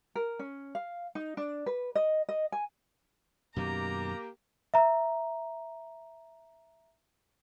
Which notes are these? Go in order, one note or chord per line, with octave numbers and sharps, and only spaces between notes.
A#4
C#4
F5
D#4
D4
B4
D#5
D#5
G#5
F#2 B2 D#3 A#3 G4 A#5
E5 A#5